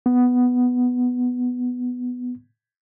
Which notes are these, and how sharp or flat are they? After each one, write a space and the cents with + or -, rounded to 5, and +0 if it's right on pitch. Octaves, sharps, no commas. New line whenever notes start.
B3 +5